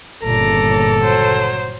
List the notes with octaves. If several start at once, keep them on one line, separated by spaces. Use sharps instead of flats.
G1 A#2 C#3 A4 A#5 D6
F#3 C5